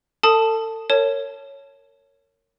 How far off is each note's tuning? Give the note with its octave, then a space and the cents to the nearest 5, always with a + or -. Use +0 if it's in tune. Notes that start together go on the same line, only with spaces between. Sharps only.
A4 +35 A5 +0 D#6 +0
A#4 -30 C#5 +0 A5 -5